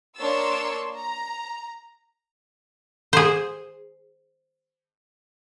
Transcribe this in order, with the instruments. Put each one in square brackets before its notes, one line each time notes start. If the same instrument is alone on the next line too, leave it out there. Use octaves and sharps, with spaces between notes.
[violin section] A#3 D4 C#5 C6 E6 A6
A#5
[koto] G#4 C5